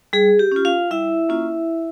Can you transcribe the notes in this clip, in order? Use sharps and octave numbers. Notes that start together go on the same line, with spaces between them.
G3 G#4
G4
C#4 F4
F4 F5
G3 E4 E5
A#3 C#4 F4